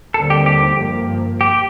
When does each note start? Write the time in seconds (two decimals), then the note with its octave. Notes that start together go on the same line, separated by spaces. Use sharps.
0.14 D#2 D3 G3 C4 A4
0.30 G4
0.46 G4
0.78 G2 F3 A#3
1.41 G4